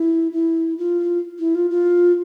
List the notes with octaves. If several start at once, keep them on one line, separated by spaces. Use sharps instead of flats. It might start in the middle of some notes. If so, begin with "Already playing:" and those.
Already playing: E4
E4
F4
E4
F4
F4